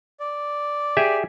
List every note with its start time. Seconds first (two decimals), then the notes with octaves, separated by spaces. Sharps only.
0.20 D5
0.97 G4 G#4 E5